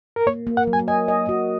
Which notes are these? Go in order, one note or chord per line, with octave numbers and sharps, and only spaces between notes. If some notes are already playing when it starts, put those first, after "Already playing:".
A#4
A#3 C#5
A#3
F#5
F#3
G#5
D#5 G#5
D#5
F#4